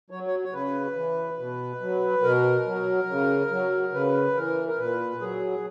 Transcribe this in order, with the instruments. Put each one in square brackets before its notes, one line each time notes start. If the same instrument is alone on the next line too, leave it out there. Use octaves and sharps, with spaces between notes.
[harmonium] F#3 C#5
C#5
C#5
C#3 B4
E3
B2
F#3
B2 A#4
F#3
C#3
F#3
C#3 B4
E3 A#4
A#4
A#2 B4
F#3 G#4